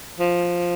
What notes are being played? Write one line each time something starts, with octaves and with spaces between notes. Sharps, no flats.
F3